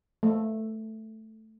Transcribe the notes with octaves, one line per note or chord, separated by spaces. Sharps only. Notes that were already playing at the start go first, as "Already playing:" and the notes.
A3